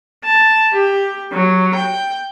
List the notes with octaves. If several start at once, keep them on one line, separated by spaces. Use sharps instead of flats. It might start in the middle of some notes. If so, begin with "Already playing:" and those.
A5
G4
F#3
G5